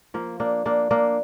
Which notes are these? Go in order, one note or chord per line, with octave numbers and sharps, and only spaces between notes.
F3 A#3
A#3 D4
A#3 D4
A#3 D4